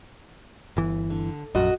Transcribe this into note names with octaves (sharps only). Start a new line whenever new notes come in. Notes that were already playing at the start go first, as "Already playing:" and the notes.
G1 E3
D3
A#1 F#2 F#4 D#5